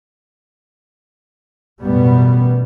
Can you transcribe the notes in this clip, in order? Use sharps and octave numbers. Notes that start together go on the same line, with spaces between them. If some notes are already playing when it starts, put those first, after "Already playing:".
A1 F#2 B2 G3 B3